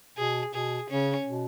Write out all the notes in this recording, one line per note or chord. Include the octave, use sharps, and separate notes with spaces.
B2 G#4
B2 G#4
C#3 C#4
B2